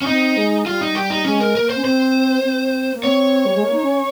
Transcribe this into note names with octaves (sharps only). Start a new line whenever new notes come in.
C#4
C4 D#4
G#3
G3 F4
D#4
G3 G4
D#4
G#3 C#4
A#4
A#3 A#4
C5
C#4
C4 C5
C4
A#3
C4 C#5
G3
G#3
A#3
D#4
C#4